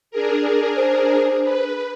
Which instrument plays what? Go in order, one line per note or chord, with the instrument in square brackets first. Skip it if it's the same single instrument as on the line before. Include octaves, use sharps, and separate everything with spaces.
[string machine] D4 G#4 A#4
[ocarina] C5
[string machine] B4